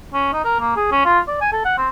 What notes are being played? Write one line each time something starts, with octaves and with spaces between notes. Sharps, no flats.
C#4
D#4
A#4
A#3
G#4
C#4
F4
D5
G#5
A4
F#5
C4